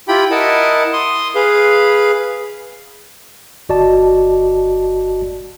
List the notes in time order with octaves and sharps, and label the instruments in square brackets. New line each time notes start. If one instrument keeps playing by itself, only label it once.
[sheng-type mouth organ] E4 F4 G4 G5 B5
E4 A#4 D#5 F#5 A5
C6 D#6
G#4 B4 F5
[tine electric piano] G1 F#4 D5 D#5 A5